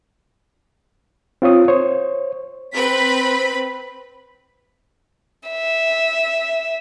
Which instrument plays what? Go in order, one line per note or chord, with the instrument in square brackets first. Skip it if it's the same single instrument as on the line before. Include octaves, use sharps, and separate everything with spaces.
[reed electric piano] C4 F4 C#5 D#6
C5 C#5
[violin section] C4 B4 B5 B6
[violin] E5